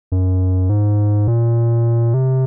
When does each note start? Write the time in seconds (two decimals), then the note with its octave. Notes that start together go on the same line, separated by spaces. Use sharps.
0.12 F#2
0.70 G#2
1.27 A#2
2.14 C3